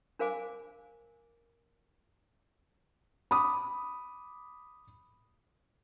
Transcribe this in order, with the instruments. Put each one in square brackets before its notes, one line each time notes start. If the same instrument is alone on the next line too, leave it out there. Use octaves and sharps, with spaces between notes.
[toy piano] D4 A#4 C5 F5 G#5 D6
[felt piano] B5 D6 D#6